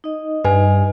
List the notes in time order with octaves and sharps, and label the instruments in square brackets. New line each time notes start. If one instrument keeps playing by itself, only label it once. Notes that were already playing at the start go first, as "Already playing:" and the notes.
[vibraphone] D#4 D#5
[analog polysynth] G2 [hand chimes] B4 G#5